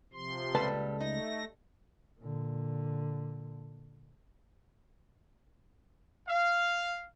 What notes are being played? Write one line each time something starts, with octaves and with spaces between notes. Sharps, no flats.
C3 F3 C6
C#2 A#2 G3 A4 B4 A5
A3 D#4 A#6
A#2 D3
F5